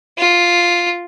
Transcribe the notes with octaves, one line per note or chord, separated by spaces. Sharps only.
F4